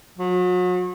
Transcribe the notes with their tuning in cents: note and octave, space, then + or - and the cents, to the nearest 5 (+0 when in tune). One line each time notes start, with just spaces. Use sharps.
F#3 -35